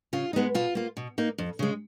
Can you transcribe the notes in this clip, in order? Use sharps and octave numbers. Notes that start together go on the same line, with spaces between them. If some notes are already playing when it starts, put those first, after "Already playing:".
C#3 F4
G#3 B3 D#4
B2 F4
A#3 F4
B2
A#3 D#4
F2
C#3 G#3